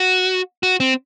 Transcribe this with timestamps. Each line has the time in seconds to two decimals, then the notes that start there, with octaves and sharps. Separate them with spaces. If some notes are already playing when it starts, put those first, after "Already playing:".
Already playing: F#4
0.63 F#4
0.80 C4